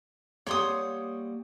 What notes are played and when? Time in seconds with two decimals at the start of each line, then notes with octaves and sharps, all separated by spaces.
0.47 G3 A#3 C#5 F#5 C6 D#6